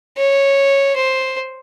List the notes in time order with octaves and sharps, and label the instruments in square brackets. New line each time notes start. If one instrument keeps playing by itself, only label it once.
[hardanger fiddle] C#5
C5